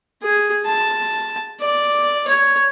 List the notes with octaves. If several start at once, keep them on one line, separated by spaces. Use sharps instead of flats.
G#4
A5
D5
C#5